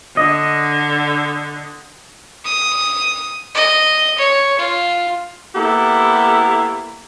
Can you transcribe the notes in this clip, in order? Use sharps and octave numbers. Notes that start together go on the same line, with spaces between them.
D3 D#5
D#6
D#5
C#5
F4
A#3 B3 E4 G4 A4